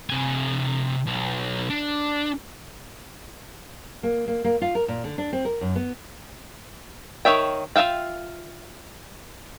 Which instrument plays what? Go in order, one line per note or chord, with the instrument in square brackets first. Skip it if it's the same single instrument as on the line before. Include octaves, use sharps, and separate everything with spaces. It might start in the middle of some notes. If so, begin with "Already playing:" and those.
[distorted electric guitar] C3 G#5
B1
D4
[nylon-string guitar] A#3
A#3
A#3
F4
A#4
A#2
D3
D4
C4
A#4
F#2
B3
[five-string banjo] D#3 C#5 E5 G5
F4 A4 E5 F5 G5